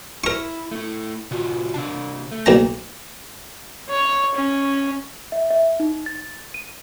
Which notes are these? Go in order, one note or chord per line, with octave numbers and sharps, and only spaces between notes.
E4 A#4 C#6
A3 E4
C3 F4 F#4
C3 D4 A5
A3
B1 A#3 A#5
C#5
C#4
E5
E5
D#4
A6
D#7